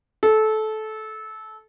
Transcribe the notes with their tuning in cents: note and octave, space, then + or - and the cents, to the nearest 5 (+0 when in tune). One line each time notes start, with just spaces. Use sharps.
A4 -20